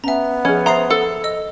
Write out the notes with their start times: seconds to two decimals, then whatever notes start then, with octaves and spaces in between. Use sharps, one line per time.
0.04 B3 C#4 E5 G#5 A#5
0.45 F3 C#4 G#4
0.66 C5 E5 A#5 C6 D#6 C7
0.90 A4
1.24 D#5 E6